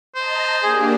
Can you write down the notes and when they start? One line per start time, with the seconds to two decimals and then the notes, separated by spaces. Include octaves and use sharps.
0.15 C5 D#5 A5 A#5
0.63 A#3 D4 G4 G#4